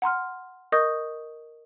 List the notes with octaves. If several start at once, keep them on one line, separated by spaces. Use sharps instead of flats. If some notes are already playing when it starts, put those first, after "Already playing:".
F#5 A#5 C6 F6
A#4 D#5 C#6 D#6 G6